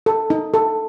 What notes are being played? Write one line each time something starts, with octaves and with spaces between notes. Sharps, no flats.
A4
D#4
A4